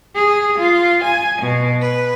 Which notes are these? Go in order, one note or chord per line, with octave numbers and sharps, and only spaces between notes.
G#4
F4
G#5
B2
B4